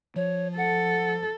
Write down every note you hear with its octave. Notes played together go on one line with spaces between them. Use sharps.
F3 C#5
A4 F#5